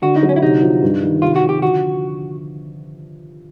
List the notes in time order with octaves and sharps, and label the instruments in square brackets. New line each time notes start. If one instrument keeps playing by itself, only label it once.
[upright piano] D3 [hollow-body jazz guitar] F#4
[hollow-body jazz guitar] D#4
[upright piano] F#3
[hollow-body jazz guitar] C#4
E4
[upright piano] C3 [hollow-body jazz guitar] D#4
[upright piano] F3
G2
D#3
[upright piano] C3 [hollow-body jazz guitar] F4
[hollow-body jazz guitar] F#4
[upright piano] F3
[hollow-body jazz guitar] G4
[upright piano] D3 [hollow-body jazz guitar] F#4